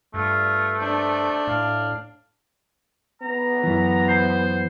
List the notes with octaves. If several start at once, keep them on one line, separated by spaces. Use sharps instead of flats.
G2 A3 F4
D4 C5
A2 F5
B3 A#5
F#2 E3
C5